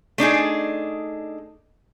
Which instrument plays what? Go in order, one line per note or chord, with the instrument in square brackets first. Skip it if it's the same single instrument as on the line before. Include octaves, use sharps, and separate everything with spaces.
[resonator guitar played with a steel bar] A3 D4 D#4 G#4